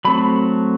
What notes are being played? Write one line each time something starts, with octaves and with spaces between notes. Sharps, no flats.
F#3 A3 C4 B5